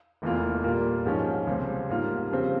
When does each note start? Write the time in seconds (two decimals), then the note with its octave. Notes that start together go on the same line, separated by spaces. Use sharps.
0.22 F1 E2 E3 A#3 F4
0.63 A#2 G3 A#3 F4
1.05 G#2 F3 G#3 C#4
1.47 C#2 C3 G3 C4
1.89 G#2 G3 A#3 F4
2.30 F2 C#3 G3 C4